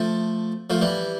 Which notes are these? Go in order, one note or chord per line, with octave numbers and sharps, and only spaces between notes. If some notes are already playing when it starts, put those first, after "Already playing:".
Already playing: F3 A3
F3 A3
E3 G3